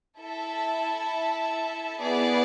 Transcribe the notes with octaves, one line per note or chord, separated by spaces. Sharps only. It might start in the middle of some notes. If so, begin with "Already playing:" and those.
E4 A4 E5 A5
B3 E4 G#4 D5